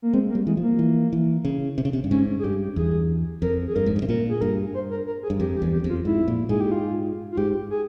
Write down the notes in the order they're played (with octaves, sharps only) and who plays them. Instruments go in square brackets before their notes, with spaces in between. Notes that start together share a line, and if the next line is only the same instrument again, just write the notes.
[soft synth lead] A#3
[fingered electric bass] G#3 [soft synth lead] C4
[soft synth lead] A#3
[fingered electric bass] G3
[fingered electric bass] E3 [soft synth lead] G#3
[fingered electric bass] F3
[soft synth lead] A#3
[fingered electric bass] E3
E3
C#3
C3
C#3
C3
G2
[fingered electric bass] G#2 [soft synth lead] C#4
[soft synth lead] G#4
[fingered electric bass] G2 [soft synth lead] G4
[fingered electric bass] E2 [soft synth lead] G#4
[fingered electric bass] F2 [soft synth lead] A#4
[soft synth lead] G#4
[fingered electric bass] G2 [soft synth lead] A#4
[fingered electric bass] G#2
G2
C3
[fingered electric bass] A#2 [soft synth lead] A#4
[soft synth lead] G#4
[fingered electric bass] G2 [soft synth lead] A#4
[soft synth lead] C5
A#4
A#4
G#4
[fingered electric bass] G2
[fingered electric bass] F2 [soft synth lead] G4
[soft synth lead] G4
[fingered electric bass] E2
[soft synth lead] G4
[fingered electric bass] F2
[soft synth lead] F4
[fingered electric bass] G#2 [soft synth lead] E4
[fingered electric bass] A#2
[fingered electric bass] G#2 [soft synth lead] G#4
[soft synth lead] G4
F4
F4
[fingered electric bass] G#2 [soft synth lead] G4
[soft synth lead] G#4